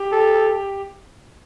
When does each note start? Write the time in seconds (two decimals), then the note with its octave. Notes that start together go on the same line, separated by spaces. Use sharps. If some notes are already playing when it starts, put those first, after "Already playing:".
Already playing: G4
0.12 A4